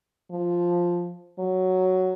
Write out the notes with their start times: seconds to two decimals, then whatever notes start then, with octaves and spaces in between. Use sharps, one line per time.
0.31 F3
1.39 F#3